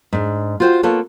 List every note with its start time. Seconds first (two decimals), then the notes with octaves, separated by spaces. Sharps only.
0.13 G#2 D4
0.60 F4 F#4 C5 D5 G5
0.83 A#3 B3 F4 A4 B4 C#5